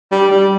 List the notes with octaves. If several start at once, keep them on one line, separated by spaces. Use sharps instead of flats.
G3
G3